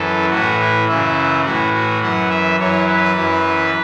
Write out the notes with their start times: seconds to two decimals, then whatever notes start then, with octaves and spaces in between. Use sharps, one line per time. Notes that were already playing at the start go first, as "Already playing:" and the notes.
Already playing: F#2 E3 A4
0.31 A2 E3 F#4
0.60 E4
0.88 F#2 C#3 E3 E4
1.45 A2 E3 F#4
1.73 F#4
2.02 F#2 E3 F#5
2.30 E5
2.59 F#2 E3 C#5
2.88 B4
3.16 F#2 E3